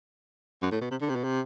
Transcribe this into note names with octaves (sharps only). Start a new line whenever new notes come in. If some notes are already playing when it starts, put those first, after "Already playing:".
F#2
A2
B2
C3
D3
C3
B2
C3